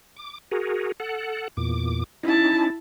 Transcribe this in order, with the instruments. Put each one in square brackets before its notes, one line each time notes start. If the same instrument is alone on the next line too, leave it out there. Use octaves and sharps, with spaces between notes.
[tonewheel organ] D6
F#4 G#4 A#4
A4 F#5
E2 A#2 D6
[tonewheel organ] C#4 D#4 [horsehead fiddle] E4 A5